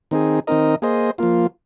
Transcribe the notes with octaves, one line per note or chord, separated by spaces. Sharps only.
D#3 C4 D#4 G#4
D#3 C4 D#4 A#4 D#5
A#3 G#4 C5 D#5
F3 A#3 F4